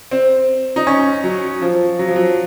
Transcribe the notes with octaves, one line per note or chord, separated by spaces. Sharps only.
C4
D#4
C#4
F#3
F3
F#3
F3
F#3